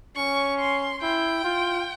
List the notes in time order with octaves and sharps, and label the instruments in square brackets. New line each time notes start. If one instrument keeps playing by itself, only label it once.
[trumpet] C#4 [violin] C#6
[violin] C6
[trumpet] E4 [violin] G5
[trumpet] F4